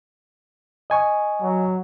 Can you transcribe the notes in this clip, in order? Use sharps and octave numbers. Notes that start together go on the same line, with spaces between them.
D#5 G#5 C#6
F#3